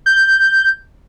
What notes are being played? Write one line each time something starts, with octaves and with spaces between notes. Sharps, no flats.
G6